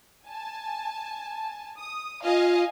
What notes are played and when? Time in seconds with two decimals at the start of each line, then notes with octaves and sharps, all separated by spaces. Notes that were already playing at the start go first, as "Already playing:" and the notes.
0.24 G#5 A5
1.79 D#6
2.24 F4 D#5 F5 G#5